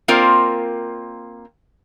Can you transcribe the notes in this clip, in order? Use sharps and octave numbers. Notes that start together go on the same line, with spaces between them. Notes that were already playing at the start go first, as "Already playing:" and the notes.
A#3 C4 F4 A#4 C5 D5